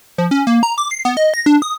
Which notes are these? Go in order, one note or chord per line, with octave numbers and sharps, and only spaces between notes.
F3
C#4
A#3
A#5
D6
C7
B3
D#5
A#6
D4
D#6